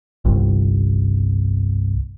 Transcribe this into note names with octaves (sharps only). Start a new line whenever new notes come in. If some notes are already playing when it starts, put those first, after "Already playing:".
G1 C2